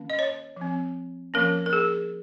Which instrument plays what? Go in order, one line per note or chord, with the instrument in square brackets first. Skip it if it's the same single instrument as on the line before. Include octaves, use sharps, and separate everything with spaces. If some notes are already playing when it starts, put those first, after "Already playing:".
Already playing: [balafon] D#3 A#3 C#4
D#5
C#5
F3 C4
F3 A#3 C#4 A#4
A#4
G#4